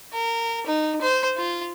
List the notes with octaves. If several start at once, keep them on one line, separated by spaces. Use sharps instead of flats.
A#4
D#4
C5
F4